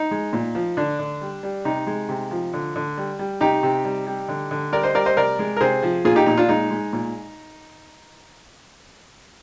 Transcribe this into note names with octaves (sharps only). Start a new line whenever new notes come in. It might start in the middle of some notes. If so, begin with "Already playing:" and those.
Already playing: D#4
G#3
A#2
F3
D3 D4
D3
G3
G3
C3 D#4
G#3
C3
F3
D3
D3
G3
G3
C3 D#4 G4
C3
G3
G3
D3
D3
G3 A#4 D5
C5 D#5
G3 A#4 D5
C5 D#5
C3 A#4 D5
G#3
A#4
C3 G#4 C5
F3
A#2 F4 G#4
D#4 G4
A#2 D#4
D4 F4
G#3 D#4
G#3
A#2